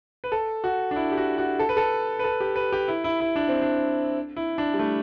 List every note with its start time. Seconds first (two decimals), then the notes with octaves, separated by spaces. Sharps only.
0.24 B4
0.32 A4
0.64 F#4
0.91 D4
0.96 E4
1.12 G4
1.17 F#4
1.38 F#4
1.59 A4
1.69 B4
1.77 A4
2.19 B4
2.24 A4
2.41 G4
2.56 B4
2.72 G4
2.88 E4
3.04 E4
3.20 E4
3.36 D4
3.48 C4
3.62 D4
4.37 E4
4.58 D4
4.74 G3
4.79 A3